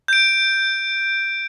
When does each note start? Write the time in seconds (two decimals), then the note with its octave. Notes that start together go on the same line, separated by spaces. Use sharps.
0.08 G6 D7